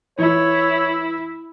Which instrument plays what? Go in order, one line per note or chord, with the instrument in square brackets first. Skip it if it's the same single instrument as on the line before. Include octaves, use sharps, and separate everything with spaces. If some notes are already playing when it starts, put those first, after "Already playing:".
[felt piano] E3 [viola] E4 [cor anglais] C#5